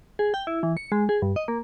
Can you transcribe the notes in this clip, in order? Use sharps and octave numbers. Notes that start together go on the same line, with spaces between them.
G#4
G5
E4
E3
C#7
G#3
G#4
G2
D#5
A#3